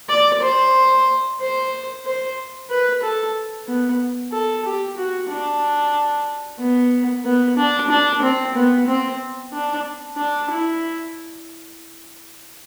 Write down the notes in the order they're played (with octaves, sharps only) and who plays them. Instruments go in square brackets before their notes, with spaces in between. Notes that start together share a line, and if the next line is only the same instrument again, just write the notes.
[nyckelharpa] D5
C5
C5
C5
B4
A4
B3
A4
G4
F#4
D4
B3
B3
D4
D4
C4
B3
C4
D4
D4
E4